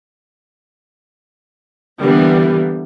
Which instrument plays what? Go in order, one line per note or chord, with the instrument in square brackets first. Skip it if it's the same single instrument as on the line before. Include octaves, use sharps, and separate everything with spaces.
[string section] D3 E3 G3 A#3 B3